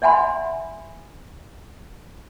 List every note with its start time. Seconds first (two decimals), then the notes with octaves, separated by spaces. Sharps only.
0.02 D5 E5 F#5 G#5 B5 C6